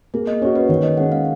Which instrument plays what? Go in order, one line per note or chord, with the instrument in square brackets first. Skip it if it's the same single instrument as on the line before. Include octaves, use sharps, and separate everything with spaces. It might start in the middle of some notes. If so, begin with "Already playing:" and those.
[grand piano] A#3 [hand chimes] G#4
[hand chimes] D#5
[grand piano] C#4 F#4 [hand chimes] C#5
[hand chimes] B4
[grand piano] D#3 [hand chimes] C#5
[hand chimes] D#5
[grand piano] G#3 C#4 [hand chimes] F#5
[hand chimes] F5